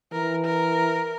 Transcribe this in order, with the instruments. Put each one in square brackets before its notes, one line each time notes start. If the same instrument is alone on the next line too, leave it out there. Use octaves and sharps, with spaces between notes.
[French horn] E3 [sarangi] A#4
[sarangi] A#4